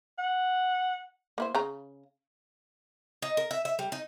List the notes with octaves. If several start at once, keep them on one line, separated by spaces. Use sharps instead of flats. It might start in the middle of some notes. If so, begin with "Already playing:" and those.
F#5
A#3 E4 C5
C#3 A#5
D#4
A#4
E5
E5
G3
D#4